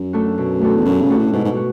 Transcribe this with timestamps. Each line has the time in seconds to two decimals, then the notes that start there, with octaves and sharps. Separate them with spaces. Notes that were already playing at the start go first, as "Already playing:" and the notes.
Already playing: F#2
0.13 A3 D4 F#4 A4
0.38 B2
0.61 A3 D4 F#4 A4
0.75 E2
0.85 F#2 B2
1.02 C#3
1.09 A3 D4 F#4 A4
1.17 A2
1.32 G#2 B2
1.44 G#2
1.57 F#4